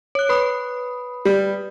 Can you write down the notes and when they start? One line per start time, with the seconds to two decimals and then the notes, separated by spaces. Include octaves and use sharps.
0.15 C#5 F#6
0.29 B4 B5 D#6
1.25 G3